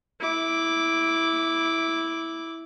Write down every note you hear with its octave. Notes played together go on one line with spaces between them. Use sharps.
E4 D6